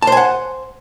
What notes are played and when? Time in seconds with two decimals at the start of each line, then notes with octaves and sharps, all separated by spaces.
0.02 A5
0.07 C5
0.12 G#5
0.17 F#5